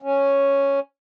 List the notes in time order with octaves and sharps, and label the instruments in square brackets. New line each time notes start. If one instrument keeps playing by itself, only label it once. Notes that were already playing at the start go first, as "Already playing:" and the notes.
[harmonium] C#4